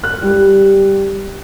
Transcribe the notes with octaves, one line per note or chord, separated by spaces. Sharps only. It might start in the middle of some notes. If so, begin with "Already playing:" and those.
F#6
G3